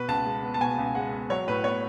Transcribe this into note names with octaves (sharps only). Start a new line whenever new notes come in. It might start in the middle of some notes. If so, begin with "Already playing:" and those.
Already playing: B2 B4
C#2 A5
G#3
B3
A5
B2 G#5
C#2
G#3 F#5
B3
F#3 C#5
A2 B4
B3 C#5